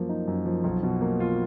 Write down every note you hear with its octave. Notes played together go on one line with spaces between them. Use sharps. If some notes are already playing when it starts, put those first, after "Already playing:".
Already playing: F#2 F3 A#3
D#4
F#2
F3
B1
B2
A#3
F4